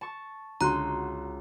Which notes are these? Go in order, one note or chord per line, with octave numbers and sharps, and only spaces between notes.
A5 C#6
C#2 D3 F#4 A#5 C6 F#6